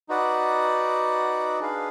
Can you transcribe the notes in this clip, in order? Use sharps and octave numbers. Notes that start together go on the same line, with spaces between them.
D#4 F#4 B4 D5 F#5
D4 G#4 B4 F5